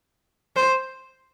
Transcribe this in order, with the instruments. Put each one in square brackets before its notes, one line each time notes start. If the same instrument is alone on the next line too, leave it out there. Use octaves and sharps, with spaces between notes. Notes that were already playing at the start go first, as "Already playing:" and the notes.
[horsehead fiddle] C5